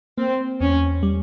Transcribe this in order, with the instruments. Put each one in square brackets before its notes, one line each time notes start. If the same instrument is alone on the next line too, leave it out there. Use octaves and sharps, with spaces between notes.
[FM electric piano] A#3 [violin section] C4
[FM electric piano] E2 [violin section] C#4
[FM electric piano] G3